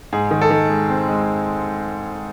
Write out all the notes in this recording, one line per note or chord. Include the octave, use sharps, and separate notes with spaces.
G#2 G#4
D#3
A4
D#3
G#3
C4
G#3